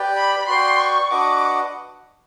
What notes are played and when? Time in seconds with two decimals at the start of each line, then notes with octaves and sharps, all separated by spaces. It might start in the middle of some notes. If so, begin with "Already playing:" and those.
Already playing: G4 B4 D5 G5
0.17 B5
0.48 F#4 B4 D5 G5 C6
0.80 C#6
1.11 D4 F#4 B4 D#5 F#5 D6